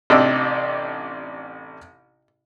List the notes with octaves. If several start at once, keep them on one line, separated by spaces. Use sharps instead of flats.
A1 C3 D4 D#4 D6 E6